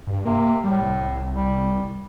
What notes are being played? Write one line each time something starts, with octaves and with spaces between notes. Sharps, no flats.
G2
C3 A#3
A2 G3
C2
C2
G3